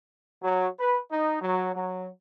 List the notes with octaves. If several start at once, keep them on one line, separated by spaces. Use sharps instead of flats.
F#3
B4
D#4
F#3
F#3